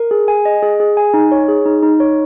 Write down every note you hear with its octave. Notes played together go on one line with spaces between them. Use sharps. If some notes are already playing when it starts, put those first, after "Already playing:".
Already playing: A#4
G#4
G#5
D#5
G#4
G#4
G#5
D#4
C#5
G#4
D#4
D#4
C#5